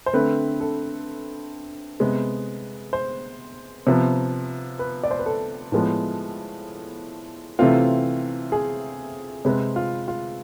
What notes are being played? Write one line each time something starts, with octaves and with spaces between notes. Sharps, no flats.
C5
D3 A3 C4 B4
A4
C3 G#3 B3
C5
C3 F3 B3
B4
D5
C5
B4
A4
A2 F3 G#3 B3
C3 E3 A3 C4 F4
G#4
C3 G#3 C4 B4
F4
F4